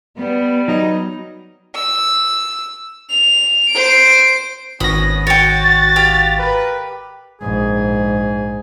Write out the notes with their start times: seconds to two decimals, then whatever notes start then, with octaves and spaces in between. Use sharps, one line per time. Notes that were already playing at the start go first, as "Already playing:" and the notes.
0.18 G3 B3
0.68 F#3 D#4
1.75 E6
3.10 F7
3.70 C5 D7
4.80 G#1 B3 C#4 B5 D#6 A#6
5.27 F#4 C#5 G5 A6
5.96 G4 F5
6.38 A#4 B4
7.41 A#1 G#2 G#4